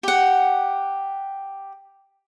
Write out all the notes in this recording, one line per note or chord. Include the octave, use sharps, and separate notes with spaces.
G4 F#5